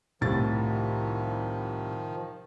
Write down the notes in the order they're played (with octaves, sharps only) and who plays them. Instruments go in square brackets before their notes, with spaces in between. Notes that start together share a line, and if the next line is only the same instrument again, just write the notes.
[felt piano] C2 A2 A6 [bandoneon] D#3 F3